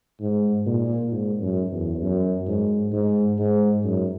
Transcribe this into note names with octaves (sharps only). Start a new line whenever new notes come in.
G#2
A#2
G#2
F#2
E2
F#2
G#2
G#2
G#2
F#2